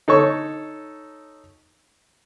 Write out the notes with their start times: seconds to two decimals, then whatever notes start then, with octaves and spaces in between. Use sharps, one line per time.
0.08 D#4 A4 C#5 C#6